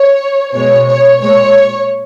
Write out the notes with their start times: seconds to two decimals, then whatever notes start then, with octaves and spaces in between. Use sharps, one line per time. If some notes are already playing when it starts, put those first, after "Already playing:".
Already playing: C#5
0.54 B2 G#3 C#5
0.87 C#5
1.20 A#2 G#3 C#5